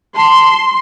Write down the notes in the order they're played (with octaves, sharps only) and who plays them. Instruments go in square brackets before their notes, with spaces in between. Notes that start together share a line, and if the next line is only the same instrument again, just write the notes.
[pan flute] A5 [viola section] C6